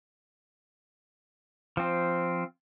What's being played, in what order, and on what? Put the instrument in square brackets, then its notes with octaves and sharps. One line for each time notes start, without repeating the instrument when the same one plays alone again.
[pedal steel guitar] F3 C4